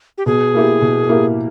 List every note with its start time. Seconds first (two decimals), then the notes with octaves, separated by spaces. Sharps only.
0.18 G4
0.26 B2 G#4
0.54 A#3 E4 G4
0.81 B2
1.09 A#3 E4 G4